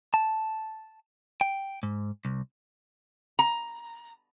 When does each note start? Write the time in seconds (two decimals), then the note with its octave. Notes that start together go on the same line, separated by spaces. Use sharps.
0.14 A5
1.41 G5
1.83 G#2
2.25 C2
3.39 A#5